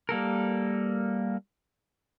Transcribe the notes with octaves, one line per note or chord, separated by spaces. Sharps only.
G3 A#3 A4 A#4